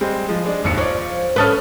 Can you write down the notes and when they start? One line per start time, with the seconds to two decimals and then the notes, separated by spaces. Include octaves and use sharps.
0.01 G3 G#3 C4
0.28 F3 G#3
0.45 G#3 D4
0.64 G#1 D#2 C#7
0.77 F3 C#5 D5
1.36 C#4 A4 B4 B5 D#6 F6